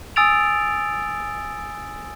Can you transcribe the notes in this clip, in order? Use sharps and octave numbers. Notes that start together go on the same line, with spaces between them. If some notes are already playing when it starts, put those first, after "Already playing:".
G#5 D#6 E6 A6 D7 F7